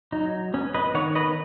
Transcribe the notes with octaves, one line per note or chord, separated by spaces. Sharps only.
F#3 D#4
B3 C#4
B4 D#5
D#3 C#5 F#5
B4 D#5